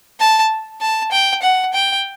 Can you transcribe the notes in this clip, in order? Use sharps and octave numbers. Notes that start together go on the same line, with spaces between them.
A5
A5
G5
F#5
G5